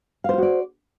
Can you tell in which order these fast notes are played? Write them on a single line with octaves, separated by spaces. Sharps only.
F5 C5 F4 F#4 D5